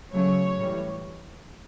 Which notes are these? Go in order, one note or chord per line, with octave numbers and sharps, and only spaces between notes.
C#3 F#3 A3 C#5
A2 E3 G3